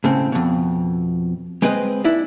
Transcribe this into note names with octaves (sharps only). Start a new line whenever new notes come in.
A2 C#3 C4
F2 B2
G#3 C4 B4 D#5
D4 E4